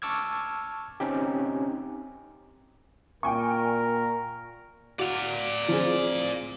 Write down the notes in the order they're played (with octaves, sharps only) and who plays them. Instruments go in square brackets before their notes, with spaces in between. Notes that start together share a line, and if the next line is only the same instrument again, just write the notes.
[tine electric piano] A5 C#6 D6 E6 F6 G#6
C4 C#4 D#4 G4
[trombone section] A#2 [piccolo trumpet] A#4 [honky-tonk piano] G5 G#5 C#6
[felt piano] F#4 [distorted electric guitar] D5 F5
[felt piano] F3 C4 G#4